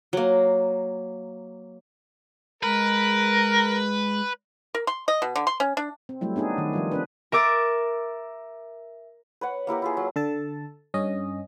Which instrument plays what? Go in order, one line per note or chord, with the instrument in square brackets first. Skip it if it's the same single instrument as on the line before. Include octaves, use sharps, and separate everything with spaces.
[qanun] F#3 A#3
[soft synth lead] G#3 [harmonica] A#4 [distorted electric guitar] B4
[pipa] A#4
C6
D#5
B2
D3
C6
C#4
D4
[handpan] C4
F#3 G3 A3 E4
B3 D4 D#4 G#4
D#3
F3 G3 F4
C4 D4 B4
[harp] A#4 E5 D6 A6
[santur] B4 C#5 F#5
A#3 E4 G4 A#4
E4 F4 G#4
F#3
[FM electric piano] D3 A4 A5
G2 C#4 D#5